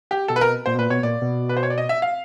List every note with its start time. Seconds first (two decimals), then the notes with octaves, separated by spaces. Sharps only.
0.11 G4
0.28 B2 A4
0.36 B4
0.41 A#4
0.66 A#2 C5
0.75 B2
0.78 A#2 B4
0.90 B2 C#5
1.03 A#2 D5
1.21 B2
1.49 B4
1.57 C5
1.63 C#5
1.70 D5
1.78 D#5
1.89 E5
2.02 F5